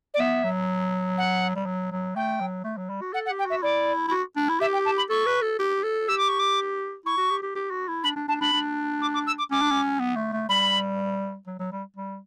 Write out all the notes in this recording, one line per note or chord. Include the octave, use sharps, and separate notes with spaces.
D5
B3 E5
F#3
F#5
G3
F#3
F#3
A3 G5
F#3
A3
F#3
G3
F#4
A4 F#5
F#5
G4
G5
F#4 E5
E4 D5
E4
F#4
D4
E4
G4 E5
G5
A5
B5
A4 C#6
B4
A4
G4
A4
G4 E6
D6
C#6
D6
E4 C#6
F#4
G4
G4
G4
F#4
E4
D4 B5
D4
D4 A5
D4 B5
D4
D6
D6
E6
D6
C#4 D6
D4
C#4
B3
A3
A3
G3 B5
F#3
F#3
G3
G3